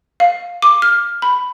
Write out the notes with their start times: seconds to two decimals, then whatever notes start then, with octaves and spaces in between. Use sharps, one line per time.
0.20 F5
0.62 D6
0.82 F6
1.22 B5